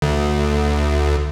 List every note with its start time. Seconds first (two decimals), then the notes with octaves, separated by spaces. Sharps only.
0.02 D2